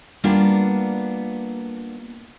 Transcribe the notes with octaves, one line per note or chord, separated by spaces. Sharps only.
G3 A#3 B3 D4 F4